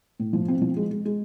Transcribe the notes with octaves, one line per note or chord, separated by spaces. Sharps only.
A2
F3
C4
F3
G#3
G#3
G#3